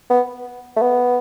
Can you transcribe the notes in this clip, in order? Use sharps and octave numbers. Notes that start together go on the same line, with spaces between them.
B3
A3
B3